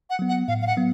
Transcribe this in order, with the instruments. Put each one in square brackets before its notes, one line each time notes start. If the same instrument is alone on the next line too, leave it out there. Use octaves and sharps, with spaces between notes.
[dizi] F#5
[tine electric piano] F#3 B3
[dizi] F#5
[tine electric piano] A2 [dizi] F5
[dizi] F5
F#5
[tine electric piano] F#3 B3